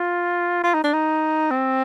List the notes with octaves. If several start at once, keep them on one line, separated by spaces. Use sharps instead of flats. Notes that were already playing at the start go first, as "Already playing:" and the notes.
Already playing: F4
F4
D#4
D4
D#4
C4